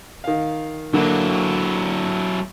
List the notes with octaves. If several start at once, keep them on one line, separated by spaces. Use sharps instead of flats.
D#3 F5
D3 F#3 A#3 E4